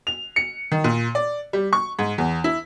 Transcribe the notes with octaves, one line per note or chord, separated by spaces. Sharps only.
F7
C#7
D#3
A#2
D5
G3
C#6
G#2
E2
E4